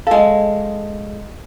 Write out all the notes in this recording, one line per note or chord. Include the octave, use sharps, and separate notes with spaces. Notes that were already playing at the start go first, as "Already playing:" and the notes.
G#3 A4 F5 G#5